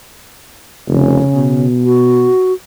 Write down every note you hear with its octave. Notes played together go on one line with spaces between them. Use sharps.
F1 C#3
B2
F#4